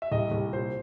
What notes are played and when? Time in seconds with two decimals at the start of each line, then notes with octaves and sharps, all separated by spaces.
0.02 E5
0.12 C2 D#5
0.31 C2
0.52 A#2 C5